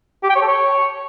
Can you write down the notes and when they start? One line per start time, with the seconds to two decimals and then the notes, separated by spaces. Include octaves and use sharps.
0.24 G4
0.30 G5
0.36 C#5
0.42 A4
0.48 C#5